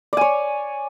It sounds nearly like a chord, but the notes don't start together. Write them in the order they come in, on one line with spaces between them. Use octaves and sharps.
D5 G#5 C#5